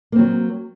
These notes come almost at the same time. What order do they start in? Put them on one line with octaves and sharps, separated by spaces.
A#3 C4 F#3